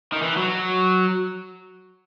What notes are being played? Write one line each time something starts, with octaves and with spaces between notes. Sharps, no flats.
D#3
E3
F#3